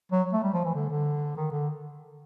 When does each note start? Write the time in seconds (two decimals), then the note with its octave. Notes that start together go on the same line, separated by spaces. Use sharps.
0.12 F#3
0.33 A3
0.43 G3
0.54 F3
0.65 E3
0.75 D3
0.90 D3
1.37 D#3
1.52 D3